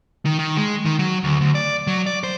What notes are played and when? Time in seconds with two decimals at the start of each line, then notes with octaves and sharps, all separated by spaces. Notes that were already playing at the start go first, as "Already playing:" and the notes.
0.26 D#3
0.39 D#3
0.57 G#3
0.85 D#3
0.99 F#3
1.24 D2
1.41 D2
1.55 D5
1.87 F#3
2.07 D5
2.24 C5